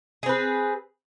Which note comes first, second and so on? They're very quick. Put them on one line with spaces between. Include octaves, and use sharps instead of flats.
G#4 C4 B4